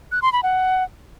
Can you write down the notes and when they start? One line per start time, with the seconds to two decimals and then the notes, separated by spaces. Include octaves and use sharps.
0.12 F#6
0.22 C6
0.33 B5
0.43 F#5